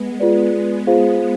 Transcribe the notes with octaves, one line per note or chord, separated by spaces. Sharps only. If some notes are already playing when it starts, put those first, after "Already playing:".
Already playing: G#3 B3
F4 G#4 B4 D5
G#3 B3 F4 G#4 C5 F5